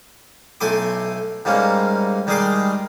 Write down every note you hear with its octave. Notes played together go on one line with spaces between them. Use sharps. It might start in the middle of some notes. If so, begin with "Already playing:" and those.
B1 A3 E4 G#5 C6 D6
G#2 G3 A#3 C#4
D#3 G3 G#3 G#4 C6 D6